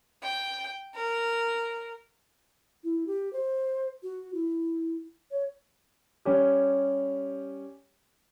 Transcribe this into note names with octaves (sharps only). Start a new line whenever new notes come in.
G5
A#4
E4
G4
C5
F#4
E4
C#5
G3 C#4 G4